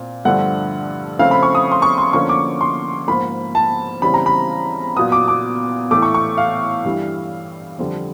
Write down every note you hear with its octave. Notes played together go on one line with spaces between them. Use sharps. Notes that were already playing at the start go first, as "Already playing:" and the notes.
Already playing: A#2 C4
G2 D3 F3 A3 D4 F#5
C#3 F3 A3 C4 F5
B5
C#6
D#6
C6
C#6
C6
D3 F3 A#3 C#4 C#6
D6
C6
G#2 F3 A#3 B5
A5
C#3 E3 G3 C4 B5
A#5
B5
A#2 F#3 B3 D#6
D6
D6
A2 E3 A3 D6
C#6
C#6
F5
G2 E3 G3
F2 D3 G3